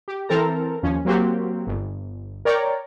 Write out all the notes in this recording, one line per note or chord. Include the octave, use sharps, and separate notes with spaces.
G4
E3 C4 A4 A#4 A5 A#5
D#2 F3 C#4
F#3 A#3 C4 F#4 G4
G1
A#4 C#5 D5 G5 A#5